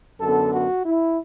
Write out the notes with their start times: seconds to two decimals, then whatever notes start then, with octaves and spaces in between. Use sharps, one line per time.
0.20 F#2 D3 B3 A4
0.53 F#4
0.85 E4